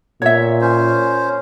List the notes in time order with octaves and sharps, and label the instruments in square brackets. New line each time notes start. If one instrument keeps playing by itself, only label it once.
[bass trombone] A#2 [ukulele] C#5 E5
[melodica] C#4 C5